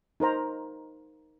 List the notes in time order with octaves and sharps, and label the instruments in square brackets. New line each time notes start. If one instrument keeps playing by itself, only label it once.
[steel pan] D#4 A#4 C5 A#5